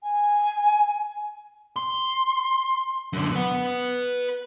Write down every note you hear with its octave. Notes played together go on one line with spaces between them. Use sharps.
G#5
C6
F#2 D3
B4 F#5